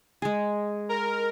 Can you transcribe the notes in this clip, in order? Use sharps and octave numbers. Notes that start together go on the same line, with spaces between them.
G#3 G#4
A#4